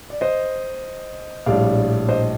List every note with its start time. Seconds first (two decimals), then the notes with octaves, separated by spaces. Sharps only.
0.10 D5
0.21 C5 D#5
1.46 A#1 A2 G3 D4 D5 F5
2.09 C5 D#5